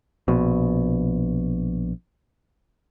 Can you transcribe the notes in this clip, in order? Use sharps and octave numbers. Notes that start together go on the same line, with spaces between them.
A#1 B2